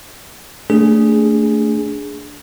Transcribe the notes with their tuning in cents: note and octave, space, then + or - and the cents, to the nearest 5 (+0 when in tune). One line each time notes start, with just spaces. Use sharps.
A3 +15 D4 -10 G#4 +0